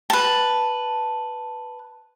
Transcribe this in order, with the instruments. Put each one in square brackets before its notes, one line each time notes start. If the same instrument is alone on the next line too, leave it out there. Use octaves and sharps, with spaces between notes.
[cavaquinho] B4 A5